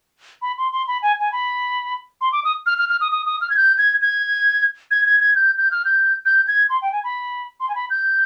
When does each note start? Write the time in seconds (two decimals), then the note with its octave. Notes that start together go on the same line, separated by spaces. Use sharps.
0.42 B5
0.58 C6
0.72 C6
0.87 B5
1.02 G#5
1.20 G#5
1.32 B5
2.21 C6
2.32 D6
2.44 D#6
2.66 F6
2.78 F6
2.89 F6
3.01 D#6
3.12 D#6
3.26 D#6
3.41 F6
3.50 G#6
3.57 G6
3.78 G#6
4.02 G#6
4.91 G#6
5.06 G#6
5.20 G#6
5.35 G6
5.58 G6
5.71 F6
5.85 G6
6.26 G6
6.48 G#6
6.70 C6
6.82 G5
6.92 G#5
7.04 B5
7.60 C6
7.69 G#5
7.75 B5
7.90 G6